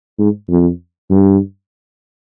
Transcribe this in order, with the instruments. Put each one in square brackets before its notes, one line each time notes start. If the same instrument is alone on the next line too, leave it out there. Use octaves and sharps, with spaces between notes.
[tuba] G#2
F2
G2